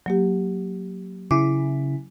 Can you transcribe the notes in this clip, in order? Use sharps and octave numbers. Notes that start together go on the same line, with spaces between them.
F#3 A#3 G4
C#3 E4 D6